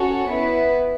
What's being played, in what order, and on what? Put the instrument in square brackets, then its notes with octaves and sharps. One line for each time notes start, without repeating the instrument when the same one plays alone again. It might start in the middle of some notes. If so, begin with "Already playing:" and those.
Already playing: [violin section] C#4 F#4 A4 C#5
B3 E4 B4